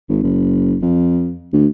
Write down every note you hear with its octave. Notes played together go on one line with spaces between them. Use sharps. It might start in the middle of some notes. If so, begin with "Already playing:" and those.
G#1
F#1
F2
D2